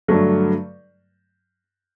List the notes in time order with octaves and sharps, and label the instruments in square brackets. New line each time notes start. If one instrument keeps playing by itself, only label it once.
[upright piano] G2 D3 F#3 A3